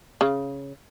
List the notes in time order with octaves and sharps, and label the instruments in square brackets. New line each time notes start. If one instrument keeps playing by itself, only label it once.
[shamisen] C#3